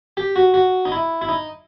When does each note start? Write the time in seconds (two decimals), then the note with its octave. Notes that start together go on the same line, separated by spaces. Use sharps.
0.17 G4
0.36 F#4
0.54 F#4
0.85 D#4
0.92 E4
1.22 E4
1.29 D#4